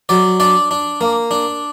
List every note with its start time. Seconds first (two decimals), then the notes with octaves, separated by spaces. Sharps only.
0.09 F#3 D5
0.40 D4 D5
0.71 D4
1.01 A#3
1.31 D4